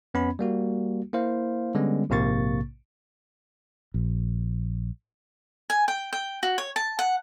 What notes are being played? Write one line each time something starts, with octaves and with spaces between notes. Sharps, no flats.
F2 B3 C#4 B5
G3 A#3 F#4
A#3 E4 C5 F5
D3 G3 G#3 B3 C#4
A#1 G#2 C3 A#3 C#6 A6
A#1
G#5
G5
G5
F#4
C#5
A5
F#5